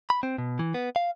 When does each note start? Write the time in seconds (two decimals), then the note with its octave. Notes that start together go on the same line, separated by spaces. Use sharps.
0.10 B5
0.23 C4
0.38 B2
0.59 E3
0.74 B3
0.96 F5